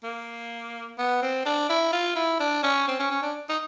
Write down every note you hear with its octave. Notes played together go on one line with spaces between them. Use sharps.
A#3
B3
C4
D4
E4
F4
E4
D4
C#4
C4
C#4
C#4
D4
D#4